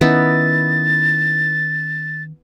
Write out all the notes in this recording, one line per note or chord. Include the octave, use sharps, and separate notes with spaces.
D#3 B3 C#4 D#4 E4 A6